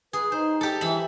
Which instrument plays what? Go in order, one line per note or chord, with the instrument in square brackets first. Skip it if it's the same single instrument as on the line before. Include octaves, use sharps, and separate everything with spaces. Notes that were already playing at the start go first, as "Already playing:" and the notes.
[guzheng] G#4 [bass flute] B4
[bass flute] D#4 [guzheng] C5
[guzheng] G4 A4
[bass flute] E3 [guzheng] E5 B5